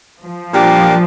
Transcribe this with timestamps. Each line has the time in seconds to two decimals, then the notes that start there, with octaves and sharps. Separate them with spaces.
0.22 F3
0.53 A#2 G3 A#3 D4 G4